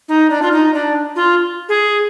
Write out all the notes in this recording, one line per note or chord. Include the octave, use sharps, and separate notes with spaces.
D#4
D4
F4
D#4
D4
F4
G#4